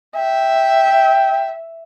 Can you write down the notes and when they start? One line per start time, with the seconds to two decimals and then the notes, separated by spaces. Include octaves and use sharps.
0.16 E5 G5